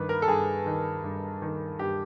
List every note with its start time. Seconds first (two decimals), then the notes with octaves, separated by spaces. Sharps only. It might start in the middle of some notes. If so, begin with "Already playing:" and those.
Already playing: G2 D#3 B4
0.09 A#4
0.22 A4
0.28 G2 G#4
0.66 D#3
1.04 G2
1.42 D#3
1.79 G2 G4